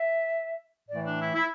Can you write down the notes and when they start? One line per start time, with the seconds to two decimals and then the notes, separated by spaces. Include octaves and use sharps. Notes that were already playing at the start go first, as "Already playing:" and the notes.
Already playing: E5
0.89 A2 E3 A3 D5
1.05 D4
1.19 E4
1.34 E4